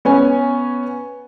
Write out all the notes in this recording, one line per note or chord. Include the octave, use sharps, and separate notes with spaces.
B3 C#4 G#5